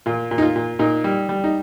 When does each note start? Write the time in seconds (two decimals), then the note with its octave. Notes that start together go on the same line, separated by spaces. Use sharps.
0.06 A#2 F4
0.31 A#2
0.38 D#4
0.42 F4
0.56 A#2
0.79 A#2 D#4
1.04 G3
1.29 G3
1.44 D#4